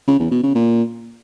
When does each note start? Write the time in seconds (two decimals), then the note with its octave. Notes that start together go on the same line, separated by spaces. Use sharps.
0.08 C#3
0.19 E2
0.31 B2
0.43 C#3
0.55 A#2